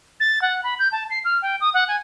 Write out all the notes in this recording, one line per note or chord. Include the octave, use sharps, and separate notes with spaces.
A6
F#5
B5
G6
A5
C7
F6
G5
D#6
F#5
G#5